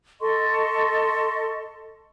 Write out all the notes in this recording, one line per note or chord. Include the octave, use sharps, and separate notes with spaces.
A4 D#5 C6 C#6